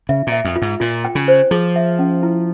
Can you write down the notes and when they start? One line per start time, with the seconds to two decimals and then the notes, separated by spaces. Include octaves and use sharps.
0.09 C#3 E5
0.27 A#2
0.32 E5
0.45 F2
0.56 F4
0.62 G#2
0.80 A#2 F4
1.05 G5
1.15 C#3
1.28 C5
1.51 F3 G#4
1.76 E5
1.99 C#4
2.23 E4